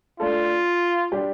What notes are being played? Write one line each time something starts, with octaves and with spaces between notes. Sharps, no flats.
A3 D4 F4 A4
G3 D4 G4